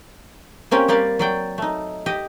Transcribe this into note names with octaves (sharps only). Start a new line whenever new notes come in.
A#3 C4 C#4 G4
G3 A#3 G4 D5 F5
F#3 D5 G5
A3 D#4
G4 D#5